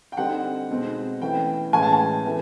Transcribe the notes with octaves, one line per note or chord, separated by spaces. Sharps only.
G5
D3 G3 C4 D#4 F#5
B2 G#3 C4 D#4
E3 A3 C#4 G5
A2 E3 G#3 C#4 G#5
A5
G#5
C3 E3 A3